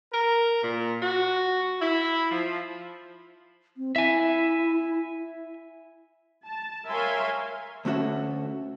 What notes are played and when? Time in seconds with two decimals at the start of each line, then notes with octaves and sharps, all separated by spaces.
0.13 A#4
0.62 A#2
1.02 F#4
1.81 E4
2.31 F3
3.77 C4
3.96 E4 E5 G#5
6.46 A5
6.88 A#4 C#5 E5 F5 G#5 C6
7.85 D2 A3 C#4 F#4 A4 E5